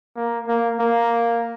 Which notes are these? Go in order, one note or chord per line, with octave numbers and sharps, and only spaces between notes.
A#3
A#3
A#3